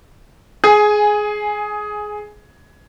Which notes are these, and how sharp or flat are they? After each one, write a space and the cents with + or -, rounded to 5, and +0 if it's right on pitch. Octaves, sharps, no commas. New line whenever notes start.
G#4 +15 G#5 +0